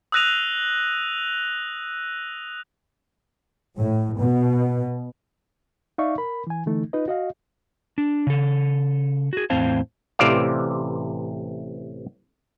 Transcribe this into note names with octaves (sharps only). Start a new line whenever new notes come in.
D#6 E6 F#6 A#6 D#7 F7
A2
B2
D#4 D5 E5 F5 C#6
A#4 B5
E3 G#5
D3 E3 A3 D#4
D#4 F4 B4 D#5
F#4 D#5 F5
D4
C#3 A4
F#4 G#4
E2 A2 C4 C5 F5 A5
A1 C3 E3 C5 D5 F5